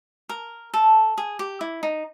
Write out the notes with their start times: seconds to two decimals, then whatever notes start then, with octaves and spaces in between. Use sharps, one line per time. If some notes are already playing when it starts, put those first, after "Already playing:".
0.29 A#4
0.74 A4
1.18 G#4
1.39 G4
1.61 E4
1.83 D#4